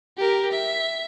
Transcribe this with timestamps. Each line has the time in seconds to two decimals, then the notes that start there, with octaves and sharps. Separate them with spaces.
0.17 G4 A#4
0.52 E5